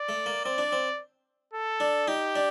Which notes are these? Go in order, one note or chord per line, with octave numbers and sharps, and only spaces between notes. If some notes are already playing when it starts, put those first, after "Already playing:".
Already playing: D5
A3
A#3
C4 D5
D4
C4
A4
D4
D#4 G4
D4